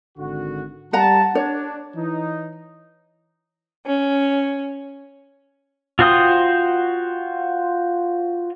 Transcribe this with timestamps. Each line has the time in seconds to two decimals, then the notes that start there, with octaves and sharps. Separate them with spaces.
0.18 G#1 D3 F#4
0.93 G3 F#5 A5 A#5
1.35 D4 C#5
1.96 E3 D#4
3.86 C#4
5.99 F4 F#4 C5 G5 D#6